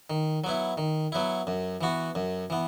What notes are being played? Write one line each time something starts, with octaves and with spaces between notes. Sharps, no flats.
D#3
F#3 B3 E4
D#3
F#3 B3 E4
F#2
E3 B3 F#4
F#2
E3 B3